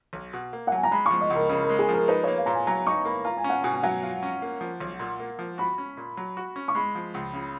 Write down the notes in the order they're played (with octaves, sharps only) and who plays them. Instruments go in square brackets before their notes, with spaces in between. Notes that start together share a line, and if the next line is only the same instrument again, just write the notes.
[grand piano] B1
B2
A#3
[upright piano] F#5
[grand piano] F#3 [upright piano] G#5
[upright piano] A#5
[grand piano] G#3 [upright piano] B5
[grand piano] F3 [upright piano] C#6
[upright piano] D#5
[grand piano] C#2
[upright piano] A#4
[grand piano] C#3 [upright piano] A#4
[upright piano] A#4
[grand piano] G#3
[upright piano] G#4
[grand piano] F3
[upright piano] A#4
[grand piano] D#4 [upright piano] B4
[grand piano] A#3 [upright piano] C#5
[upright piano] F5
[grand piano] A#2 [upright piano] A#5
[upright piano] G#5
[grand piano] F#3 [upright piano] A#5
[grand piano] D#4 [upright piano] C#6
[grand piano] A#3 [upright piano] B5
[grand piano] F4 [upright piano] A#5
[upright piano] G#5
[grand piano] C#4 [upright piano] F#5
[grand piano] B2 [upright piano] G#5
[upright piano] G#5
[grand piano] F#3 [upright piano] F#5
[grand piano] F4
C#4
A#3
F3
B1
A#2
A#3
F3
[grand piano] F#4 [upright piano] B5
[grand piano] C#4
A#2
F#3
F#4
C#4
[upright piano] C#6
[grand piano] G#3 [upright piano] B5
[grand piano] F3
C#2
C#3